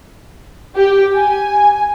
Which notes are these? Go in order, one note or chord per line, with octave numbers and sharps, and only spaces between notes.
G4
G#5